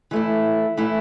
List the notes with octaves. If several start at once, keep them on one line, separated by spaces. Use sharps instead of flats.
E3 A3 E4
E3 A3 E4